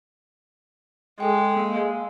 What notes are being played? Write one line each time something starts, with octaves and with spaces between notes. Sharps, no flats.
G#3 A4 G5
A#3 F5